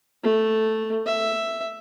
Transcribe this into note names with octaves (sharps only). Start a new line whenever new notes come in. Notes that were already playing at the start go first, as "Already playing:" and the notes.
A3
E5